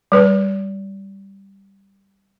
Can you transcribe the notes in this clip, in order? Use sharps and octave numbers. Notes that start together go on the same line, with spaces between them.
G3 B4